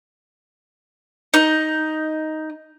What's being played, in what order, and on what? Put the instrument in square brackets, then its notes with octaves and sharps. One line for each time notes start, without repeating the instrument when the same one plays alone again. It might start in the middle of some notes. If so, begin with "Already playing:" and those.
[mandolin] D#4